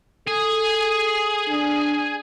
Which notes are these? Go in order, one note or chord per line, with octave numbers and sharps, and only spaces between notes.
G#4 A4
D4